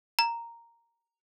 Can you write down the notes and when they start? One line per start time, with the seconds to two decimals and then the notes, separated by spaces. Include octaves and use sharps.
0.19 A#5